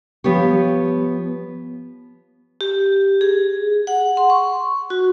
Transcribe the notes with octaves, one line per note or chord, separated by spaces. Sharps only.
F3 B3 G4 C#5
G4
G#4
F#5
C6
C#6
F#4